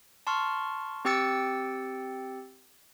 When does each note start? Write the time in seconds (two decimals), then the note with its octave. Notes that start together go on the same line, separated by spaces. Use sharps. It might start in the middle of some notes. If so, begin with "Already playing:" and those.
0.27 A5 C6 C#6 F6
1.05 C4 G4 G5 E6 A6 C#7